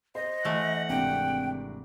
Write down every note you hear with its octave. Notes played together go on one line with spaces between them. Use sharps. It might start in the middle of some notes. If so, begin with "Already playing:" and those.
C5 D#5
E3 A3 F#5
G#1 C3 D4 G5